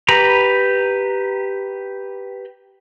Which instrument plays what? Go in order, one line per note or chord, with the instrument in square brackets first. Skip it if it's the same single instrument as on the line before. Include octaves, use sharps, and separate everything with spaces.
[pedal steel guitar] G4 B4 A#5 B5